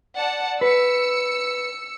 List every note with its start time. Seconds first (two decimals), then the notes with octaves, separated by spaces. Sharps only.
0.17 D5 F#5 A5
0.61 B4 E6 C#7